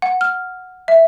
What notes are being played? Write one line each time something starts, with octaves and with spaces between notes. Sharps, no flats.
F#5
F6
E5